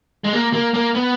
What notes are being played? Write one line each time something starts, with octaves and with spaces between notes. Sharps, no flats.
G#3
A#3
A#3
A#3
B3